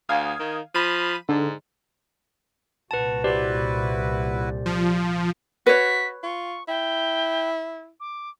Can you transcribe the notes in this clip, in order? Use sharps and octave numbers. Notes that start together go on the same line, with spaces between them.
D2 F5 D#6 G#6
D#3
F3 B5 B6 D#7
G#2 D3
C2 A#2 F#4 B4 A5
E4 F#4 G4 B4 C5 D5
F3
F#4 B4 C#5 B6
F4 C#6
E4 G5
D6